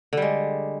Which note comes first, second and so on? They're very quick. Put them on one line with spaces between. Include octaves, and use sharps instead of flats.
D3 G3 G#3